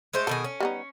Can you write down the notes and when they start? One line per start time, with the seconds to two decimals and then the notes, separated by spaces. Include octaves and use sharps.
0.13 G#3 A3 C5
0.27 B2 D#3 G#4 A4
0.44 C#4
0.60 G3 B3 D#4